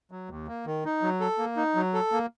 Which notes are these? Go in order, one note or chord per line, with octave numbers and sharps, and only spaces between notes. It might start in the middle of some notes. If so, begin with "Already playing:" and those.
F#3
D#2
A#3
D#3
D#4
F#3
A4
A#3
D#4
F#3
A4
A#3